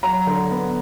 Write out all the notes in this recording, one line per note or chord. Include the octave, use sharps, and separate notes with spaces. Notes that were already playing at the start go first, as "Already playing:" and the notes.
F#3 A#5
D3
B3